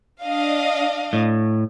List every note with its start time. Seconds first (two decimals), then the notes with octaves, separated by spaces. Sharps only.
0.22 D4 D#5 F5
1.13 A2